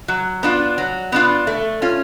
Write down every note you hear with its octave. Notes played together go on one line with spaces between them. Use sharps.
F#3
B3 D4 F4
F#3
B3 D4 F4
A3
C#4 F4